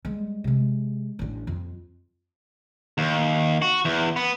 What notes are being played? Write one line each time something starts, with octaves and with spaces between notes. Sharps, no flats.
G3 G#3
C3 G#3
A1 D4
F2 F3
D#2
F#4
E2
B3